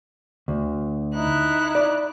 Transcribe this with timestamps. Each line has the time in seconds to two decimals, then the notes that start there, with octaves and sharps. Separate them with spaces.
0.48 D2
1.15 D#4 E4 F#6
1.75 D5